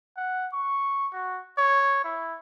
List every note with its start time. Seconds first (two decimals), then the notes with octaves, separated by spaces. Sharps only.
0.17 F#5
0.53 C#6
1.13 F#4
1.58 C#5
2.04 E4